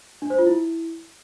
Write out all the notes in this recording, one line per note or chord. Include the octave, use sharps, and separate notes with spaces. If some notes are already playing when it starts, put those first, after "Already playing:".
D4
C5
F4
E4